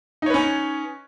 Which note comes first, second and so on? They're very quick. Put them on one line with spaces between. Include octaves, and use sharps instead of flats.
D#4 C#5 B4 C#4